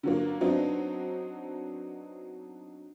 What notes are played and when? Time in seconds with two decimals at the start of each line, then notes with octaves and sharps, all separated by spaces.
0.03 D3 F#3 A#3
0.41 F#3 B3 C4 D4 D#4